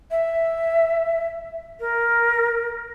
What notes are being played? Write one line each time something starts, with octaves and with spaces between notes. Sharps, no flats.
E5
A#4